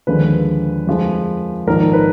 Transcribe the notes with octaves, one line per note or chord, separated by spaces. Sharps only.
D#2 D3 F3 G#3 B4
F2 F3 G#3
A#1 G#2 D#3 A#4
B4